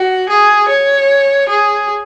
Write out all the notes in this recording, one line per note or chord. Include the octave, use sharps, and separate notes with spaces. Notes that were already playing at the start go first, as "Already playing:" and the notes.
Already playing: F#4
G#4
C#5
G#4